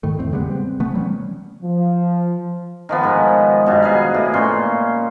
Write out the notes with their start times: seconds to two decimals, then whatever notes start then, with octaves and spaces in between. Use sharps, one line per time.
0.03 G#2 D#3 E3 A3
0.19 E2 A2 C4
0.32 C#3 G3 G#3 B3
0.51 C4
0.80 C3 E3 A3 B3
0.94 F#3 G3 C4 C#4
1.62 F3
2.89 D#3 F3 B3
3.04 G#2
3.66 G2 B2
3.82 G#4 B4 F5
4.14 A2
4.34 A#2 C#4 C6